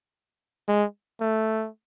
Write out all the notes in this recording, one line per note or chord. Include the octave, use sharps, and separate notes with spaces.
G#3
A3